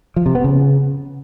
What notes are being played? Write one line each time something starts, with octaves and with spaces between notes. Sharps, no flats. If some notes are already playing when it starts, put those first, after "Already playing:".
F3
C3
B3
C#3